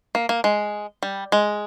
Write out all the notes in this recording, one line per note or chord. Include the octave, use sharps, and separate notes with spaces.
A#3
A#3
G#3
G3
G#3